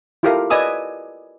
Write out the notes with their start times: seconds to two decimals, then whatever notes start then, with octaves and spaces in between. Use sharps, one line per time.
0.23 E4 F4 G4 A4 A#4 F5
0.50 B4 D5 D#5 G#5 D#6 E6